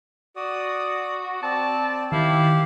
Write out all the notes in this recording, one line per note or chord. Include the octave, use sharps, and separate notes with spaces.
F#4 D5 D#6
C4 D5 A5
D#3 E4 G4 F5